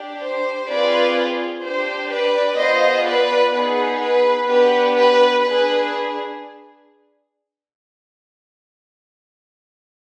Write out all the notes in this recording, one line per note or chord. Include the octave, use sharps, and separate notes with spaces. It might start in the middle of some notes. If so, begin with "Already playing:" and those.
Already playing: D4 G4
C5
C4 F4 G#4 B4 D5
D4 G4 C5
B4 D5
B3 F4 G#4 C5 D#5
B4 D5
B3 D#4 G#4 B4
B4
B3 D4 G4 B4
B4
D4 G#4 B4